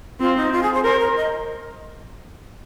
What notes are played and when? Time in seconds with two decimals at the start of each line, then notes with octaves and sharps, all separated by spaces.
0.20 C4 F4
0.36 D#4
0.52 F4
0.63 G#4
0.74 C5
0.84 A#4 C5
1.00 A#4
1.16 D#5